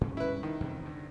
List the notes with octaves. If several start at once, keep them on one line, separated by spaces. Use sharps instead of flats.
G2 C#4
E4 B4
D#3
E2 C3
G2 D3